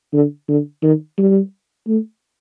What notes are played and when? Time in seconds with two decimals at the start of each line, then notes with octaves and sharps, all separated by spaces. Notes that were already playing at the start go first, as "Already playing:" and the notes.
0.13 D3
0.48 D3
0.82 D#3
1.18 G3
1.87 A3